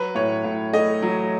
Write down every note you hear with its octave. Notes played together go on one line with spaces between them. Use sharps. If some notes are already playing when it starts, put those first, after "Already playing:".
Already playing: F#3 B4
A2 C#5
A2
A3 D#5
F#3